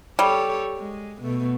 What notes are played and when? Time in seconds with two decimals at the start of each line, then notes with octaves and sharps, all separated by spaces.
0.19 G3 G4 A4 C#5
0.77 G#3
1.22 B2 A3